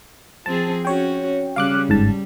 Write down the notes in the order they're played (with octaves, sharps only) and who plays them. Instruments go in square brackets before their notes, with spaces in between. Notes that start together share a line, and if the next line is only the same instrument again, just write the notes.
[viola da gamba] F3 C4 G#4 [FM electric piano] A5
[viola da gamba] C#4 F#4 [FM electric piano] C#5 G5
[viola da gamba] C#3 G3 [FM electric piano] F5 D6 F#6
[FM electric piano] G1 G#2 A5 [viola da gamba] G3